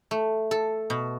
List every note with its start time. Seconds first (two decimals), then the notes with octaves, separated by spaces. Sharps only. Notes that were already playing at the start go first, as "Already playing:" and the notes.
0.11 A3
0.51 A4
0.90 B2